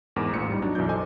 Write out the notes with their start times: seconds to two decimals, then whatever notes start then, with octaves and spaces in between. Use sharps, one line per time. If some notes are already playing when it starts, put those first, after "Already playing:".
0.16 E2 G#2 A#4 D6
0.33 A1 A#2 C#7
0.49 G3 D#4
0.62 F#3 D4 D#4
0.75 B1 F#2 E3 D#4 D5 G6
0.88 A4 C5 D#5 G#5 D6